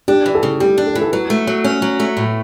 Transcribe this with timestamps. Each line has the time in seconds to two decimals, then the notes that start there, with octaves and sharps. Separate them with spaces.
0.08 D4 G4
0.26 E3
0.35 A4
0.43 C#3
0.60 G3 G4
0.78 D4
0.87 A4
0.95 E3
1.01 A4
1.12 F#3 B4
1.30 A3
1.47 F#3
1.64 C#4
1.82 F#3
2.00 A3
2.17 A2